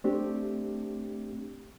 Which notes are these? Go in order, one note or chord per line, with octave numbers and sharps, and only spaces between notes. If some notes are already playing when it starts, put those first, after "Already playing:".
A3 C4 D4 G4